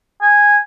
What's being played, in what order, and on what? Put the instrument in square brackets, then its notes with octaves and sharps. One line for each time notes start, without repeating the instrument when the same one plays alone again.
[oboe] G#5